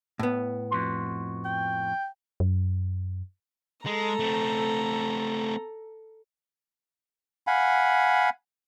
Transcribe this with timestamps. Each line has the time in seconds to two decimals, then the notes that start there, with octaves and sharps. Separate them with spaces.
0.19 A2 B3
0.71 F2 F#4 C6
1.45 G5
2.40 F#2
3.86 G#3 A4 A#5
4.19 A3 C4
7.47 F5 F#5 G#5 B5